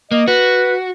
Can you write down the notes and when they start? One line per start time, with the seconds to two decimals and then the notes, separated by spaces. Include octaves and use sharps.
0.11 A#3 D#5
0.28 F#4 B4